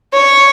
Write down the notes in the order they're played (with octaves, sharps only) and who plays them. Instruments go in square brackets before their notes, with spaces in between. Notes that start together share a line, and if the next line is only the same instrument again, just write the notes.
[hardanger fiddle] C#5